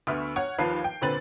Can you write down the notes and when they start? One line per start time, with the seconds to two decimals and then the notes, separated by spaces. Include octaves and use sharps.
0.07 D2 B3 B4 E5 C#6 F6
0.36 C#5 F#5 G#6
0.59 D#2 F3 B4 F5 A5 C7
0.84 G5
1.02 A#2 D3 C4 B4 A6 F#7